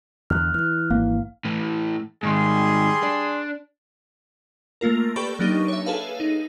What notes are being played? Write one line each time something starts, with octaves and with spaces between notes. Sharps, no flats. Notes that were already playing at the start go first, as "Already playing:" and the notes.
E2 D3 F6 F#6
E3 F6 F#6
G#1 A#3 F5
A2 E3
G#2 D#3 G3 G#4 C6
D4
A3 A#3 F4 A#4
G4 A4 B4 D5 B5 C#6
F#3 A#3 D4 D#4 G4
C#5 E5
G#4 A4 B4 F5
D#4